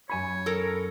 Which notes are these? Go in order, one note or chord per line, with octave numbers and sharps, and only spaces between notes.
F#2 C#5 G#5 B5
A4 A#4